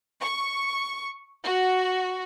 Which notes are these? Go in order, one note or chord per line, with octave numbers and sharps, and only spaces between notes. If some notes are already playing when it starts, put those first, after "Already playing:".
C#6
F#4